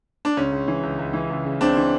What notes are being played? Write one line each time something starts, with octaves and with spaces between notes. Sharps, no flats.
D4
C#2 C#4
C#2
E3
C#2
C#2
E3
C#2
C#3
C#2 C4 D4
E3